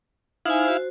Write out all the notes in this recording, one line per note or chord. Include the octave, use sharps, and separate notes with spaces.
D#4 E4 C5 F5 G#5
F#4 C5